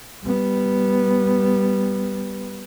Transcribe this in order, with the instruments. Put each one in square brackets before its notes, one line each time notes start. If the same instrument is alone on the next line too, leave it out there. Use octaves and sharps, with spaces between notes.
[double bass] G3 B3